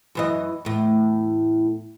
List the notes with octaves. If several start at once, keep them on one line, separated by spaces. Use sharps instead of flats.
F#2 E3 D#5
E2 A2